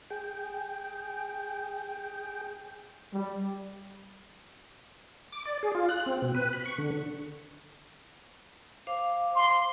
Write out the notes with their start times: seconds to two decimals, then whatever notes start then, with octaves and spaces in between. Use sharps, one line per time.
0.10 G#4 G5
3.12 G3
5.32 D6
5.45 D5
5.63 G#4
5.75 F4
5.89 F#6
6.06 C4
6.22 B2
6.35 B4
6.53 B5
6.66 C#6
6.78 D3
8.87 C5 F5 D6
9.35 C6